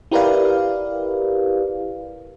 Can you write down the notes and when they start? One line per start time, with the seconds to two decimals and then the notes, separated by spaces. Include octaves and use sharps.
0.11 E4 G4 A#4 B4 D5 F5